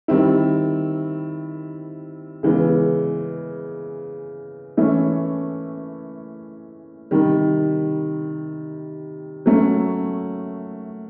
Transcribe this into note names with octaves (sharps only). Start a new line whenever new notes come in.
D#3 G3 C4 E4
C#3 E3 G#3 B3
E3 A3 C#4 E4
C3 D#3 G3
F#3 A3 C#4